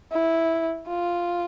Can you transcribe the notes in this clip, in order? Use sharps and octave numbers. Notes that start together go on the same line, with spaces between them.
E4
F4